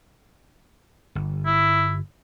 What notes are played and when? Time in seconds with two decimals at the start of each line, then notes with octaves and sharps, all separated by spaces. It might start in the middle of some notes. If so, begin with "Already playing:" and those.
1.15 G1
1.46 E4